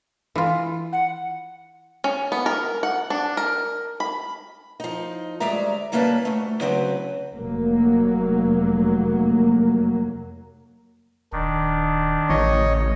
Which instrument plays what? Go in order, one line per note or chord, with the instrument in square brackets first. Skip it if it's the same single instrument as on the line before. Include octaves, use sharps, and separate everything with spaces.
[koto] E3 F4
[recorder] F#5
[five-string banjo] C#4
B3
A#4
F#5
D4
A#4
B5
[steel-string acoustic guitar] F3 D#4
D2 G3 G#3 D5 E5 A#5
C#3 G3 A#3 C#4 B4 A5
D2 A3
C#3 F#3 C4 B4
[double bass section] F1 F#3 A#3
[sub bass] D#1 [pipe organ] D#3 D4
[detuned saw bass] A1 [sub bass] D3 [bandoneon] C#5 D#5